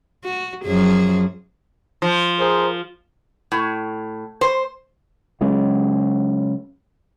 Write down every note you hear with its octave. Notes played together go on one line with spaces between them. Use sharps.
F#4
F#2 F3 G#4
F3
G#4 A#4 C5
A2
C5
C#3 F#3 G#3 C#4